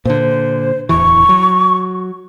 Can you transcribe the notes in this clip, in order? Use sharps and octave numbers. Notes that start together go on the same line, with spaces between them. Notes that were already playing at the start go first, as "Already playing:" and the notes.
A#2 D3 C5
D1 E2 E3 C#6
F#3